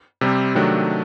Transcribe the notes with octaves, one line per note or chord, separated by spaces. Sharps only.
C3 G3 C4
C3 D#3 F#3 A3 D4